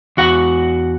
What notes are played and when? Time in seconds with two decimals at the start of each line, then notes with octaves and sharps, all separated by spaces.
0.17 E2 F#4 F#5